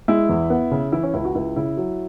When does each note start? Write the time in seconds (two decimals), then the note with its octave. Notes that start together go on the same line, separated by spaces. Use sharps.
0.08 G#3 E4
0.29 E2
0.50 B3
0.71 C#3
0.92 E3 E4
1.03 C#4
1.14 C#2 E4
1.25 F#4
1.35 C#2 E4
1.56 C#3 E4
1.77 F#3